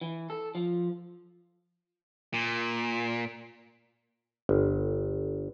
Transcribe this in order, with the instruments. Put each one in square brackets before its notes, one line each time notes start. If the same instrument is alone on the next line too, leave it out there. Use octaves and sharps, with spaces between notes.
[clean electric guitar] E3
A4
F3
[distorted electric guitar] A#2
[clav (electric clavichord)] G1